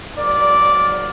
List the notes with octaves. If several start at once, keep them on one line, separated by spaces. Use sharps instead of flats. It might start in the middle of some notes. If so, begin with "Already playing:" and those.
G#2 F#3 A#3 D5